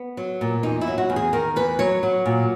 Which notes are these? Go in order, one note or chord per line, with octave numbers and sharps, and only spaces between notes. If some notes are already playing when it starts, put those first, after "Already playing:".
Already playing: B3
F#3
A#2
E2 D#4
E4
F#3
F#4
E2
G#4
D#3 A#4
E2 B4
F#3 C#5
F#3
A#2